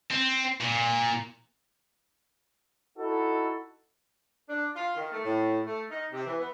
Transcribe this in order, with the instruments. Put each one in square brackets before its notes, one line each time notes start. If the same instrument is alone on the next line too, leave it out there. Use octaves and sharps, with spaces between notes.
[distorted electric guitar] C4
A#2
[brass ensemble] D#4 E4 F#4 A4
[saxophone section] D4
F4
D#3
A3
A2
A3
D#4
C3
E3
B3